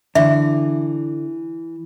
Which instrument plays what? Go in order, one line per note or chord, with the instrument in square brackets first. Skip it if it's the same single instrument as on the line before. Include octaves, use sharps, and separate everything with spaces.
[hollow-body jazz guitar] D3 [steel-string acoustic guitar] E3 [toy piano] E5